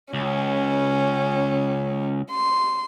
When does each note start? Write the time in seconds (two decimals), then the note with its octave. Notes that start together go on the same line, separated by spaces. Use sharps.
0.14 C#2 C#4
2.31 C6